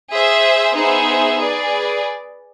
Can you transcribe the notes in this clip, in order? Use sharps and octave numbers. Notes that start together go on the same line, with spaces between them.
G#4 C5 E5
B3 D#4 G#4 C5 E5
G#4 B4 D5